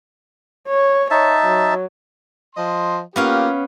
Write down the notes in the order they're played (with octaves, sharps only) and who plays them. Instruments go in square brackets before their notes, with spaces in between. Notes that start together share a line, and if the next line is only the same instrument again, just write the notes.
[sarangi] C#5
[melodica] D#4 E5 A5 [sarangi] C#5
[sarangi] F#3
[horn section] F3 D#5 C6
[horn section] A#3 F4 G4 [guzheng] B3 C#4 F5